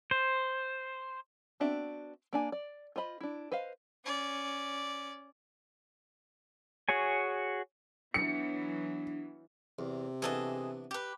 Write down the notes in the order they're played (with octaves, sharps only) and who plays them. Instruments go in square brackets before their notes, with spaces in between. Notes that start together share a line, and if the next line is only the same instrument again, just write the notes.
[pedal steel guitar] C5
[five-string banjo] B3 C4 D4 F#4 E5
A#3 D4 G#5
D5
F4 C5 D#5 B5
D4 E4
B4 C5 D#5 F5
[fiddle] C#4 D5
[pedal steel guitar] F#4 G#4 C#5 G#5
[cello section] E3 F#3 B3 [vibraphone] D4 [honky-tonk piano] C#7
[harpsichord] E2 [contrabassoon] C3
[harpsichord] E3 B3 D4 [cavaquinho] G#4 A4 D#5
[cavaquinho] G4 B4